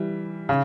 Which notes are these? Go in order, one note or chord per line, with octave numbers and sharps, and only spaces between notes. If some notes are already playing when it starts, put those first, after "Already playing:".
Already playing: E3 G3
C#3